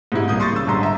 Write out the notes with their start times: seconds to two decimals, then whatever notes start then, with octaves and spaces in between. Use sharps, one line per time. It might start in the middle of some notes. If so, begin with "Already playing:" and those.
0.12 G#2 C3 E4
0.28 C2 A#3 D#6 G6
0.40 C6 C#6 D#6 A6
0.52 C#3 E6
0.67 G1 G#2 A#5 C6
0.83 E5 A#5